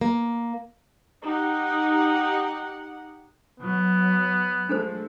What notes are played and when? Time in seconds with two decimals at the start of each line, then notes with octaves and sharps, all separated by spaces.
0.01 A#3
1.23 D#4 G4 F#5
3.60 F#3 B3
4.69 F3 G#3 A3 D4 A4 C5